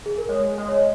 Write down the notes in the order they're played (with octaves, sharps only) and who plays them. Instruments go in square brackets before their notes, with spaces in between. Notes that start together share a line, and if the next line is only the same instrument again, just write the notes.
[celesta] G#4
A#4
[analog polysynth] G#3 [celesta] C#5
[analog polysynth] G#3
[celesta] C#5
D#5